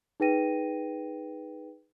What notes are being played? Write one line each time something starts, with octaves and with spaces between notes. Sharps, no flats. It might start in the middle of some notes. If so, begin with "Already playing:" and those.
D#4 G#4 B4 G5 A#6 D#7